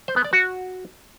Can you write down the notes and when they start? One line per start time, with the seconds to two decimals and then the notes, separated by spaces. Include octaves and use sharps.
0.08 C5
0.16 B3
0.25 D5
0.33 F#4